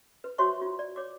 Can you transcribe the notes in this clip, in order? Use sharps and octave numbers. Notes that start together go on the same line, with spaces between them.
B4
F#4 C5 C#5 E5 C6 C#6
F4
D5
C#5 D6